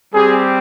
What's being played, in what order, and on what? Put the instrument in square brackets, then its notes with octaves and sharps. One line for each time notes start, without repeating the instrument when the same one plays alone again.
[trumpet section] G3 C4 G4 G#4